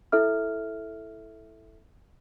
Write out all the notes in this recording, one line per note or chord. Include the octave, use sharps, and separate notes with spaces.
E4 A4 E5 F6